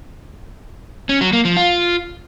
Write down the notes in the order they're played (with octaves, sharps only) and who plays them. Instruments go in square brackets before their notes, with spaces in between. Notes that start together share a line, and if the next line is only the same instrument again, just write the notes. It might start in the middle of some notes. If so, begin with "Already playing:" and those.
[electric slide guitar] C#4
F#3
A#3
F3
F4